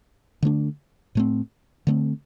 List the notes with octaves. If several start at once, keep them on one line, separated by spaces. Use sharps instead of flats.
D3 A3 D4
A2 A3 C4
D3 A3 C4